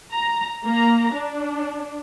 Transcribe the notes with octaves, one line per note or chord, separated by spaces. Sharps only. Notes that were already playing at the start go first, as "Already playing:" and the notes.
A#5
A#3 A#5
D4